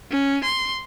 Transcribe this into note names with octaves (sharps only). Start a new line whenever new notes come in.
C#4
C6